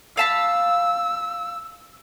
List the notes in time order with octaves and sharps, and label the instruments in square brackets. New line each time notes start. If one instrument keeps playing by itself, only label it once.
[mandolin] F5 A5 B5 [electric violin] E6